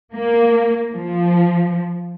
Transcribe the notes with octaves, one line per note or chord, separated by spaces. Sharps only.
A#3
F3